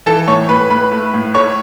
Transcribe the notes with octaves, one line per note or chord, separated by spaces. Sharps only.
E3 A4 A5
A2 C#5 C#6
A2 B4 B5
A2 B4 B5
A3
A2
A3 C#5 C#6